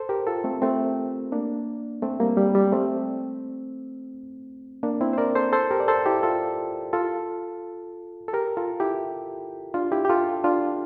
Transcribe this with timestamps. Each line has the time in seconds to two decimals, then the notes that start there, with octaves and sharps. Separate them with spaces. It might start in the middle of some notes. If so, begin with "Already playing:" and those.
Already playing: A4 C5
0.09 G4 A#4
0.27 F4 A4
0.44 A3 C4
0.62 A3 C4
1.32 A#3 D4
2.03 A3 C4
2.20 G3 A#3
2.37 G3
2.55 G3
2.72 A3 C4
4.83 A#3 D4
5.01 C4 E4
5.13 C5
5.18 A#4 D5
5.36 A4 C5
5.53 A4 C5
5.71 G4 A#4
5.80 D5
5.88 A4 C5
6.06 E4 G4
6.23 F4 A4
6.93 F4 A4
8.28 A4
8.33 G4 A#4
8.57 F4 A4
8.80 E4 G4
9.74 D4 F4
9.92 E4 G4
10.05 G4
10.09 F4 A4
10.44 D4 F4